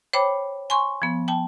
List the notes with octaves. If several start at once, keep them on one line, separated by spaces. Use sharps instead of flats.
C5 C#5 G5 B5 D6
G#5 C6 C#6
F3 B3
G5 A5